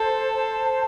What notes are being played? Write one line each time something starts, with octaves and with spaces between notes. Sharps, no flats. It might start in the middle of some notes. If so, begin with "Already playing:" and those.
Already playing: A4 C5 A5
C5